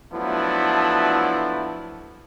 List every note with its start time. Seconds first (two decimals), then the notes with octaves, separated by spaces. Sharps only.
0.13 F3 F#3 A3 B3 D4 E4